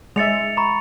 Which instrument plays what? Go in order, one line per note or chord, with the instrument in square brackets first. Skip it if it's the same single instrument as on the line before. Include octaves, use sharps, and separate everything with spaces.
[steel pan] G#3 E5 [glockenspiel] A6 C#7 F7
[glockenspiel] A#5 B5 C#6